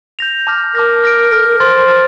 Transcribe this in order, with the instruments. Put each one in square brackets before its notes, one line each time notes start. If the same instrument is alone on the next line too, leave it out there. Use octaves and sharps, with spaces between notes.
[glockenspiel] G6 A#6 F7
A5 D6 F6 A#6
[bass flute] A#4 [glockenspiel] A5 D6 F6 A#6
[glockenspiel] F6 A#6 D7
[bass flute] A4 [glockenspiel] F6 A#6 D7
[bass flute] A#4
[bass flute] C5 [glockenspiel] C6 F6 A6
[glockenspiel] C6 F6 A6